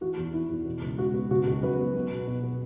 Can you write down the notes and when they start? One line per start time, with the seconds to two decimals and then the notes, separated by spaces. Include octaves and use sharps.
0.01 E3 F#4
0.17 E2
0.33 B3 E4
0.49 E2
0.66 B2
0.81 C#2
0.98 G#3 F#4
1.14 B3
1.31 C#3 F#4
1.47 C#2
1.62 F#3 F#4 B4
1.79 B3
1.95 B3
2.10 B2
2.27 B2
2.43 B3